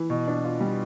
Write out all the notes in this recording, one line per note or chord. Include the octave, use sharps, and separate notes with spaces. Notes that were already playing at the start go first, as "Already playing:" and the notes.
Already playing: E3
B2
D4
F4
G3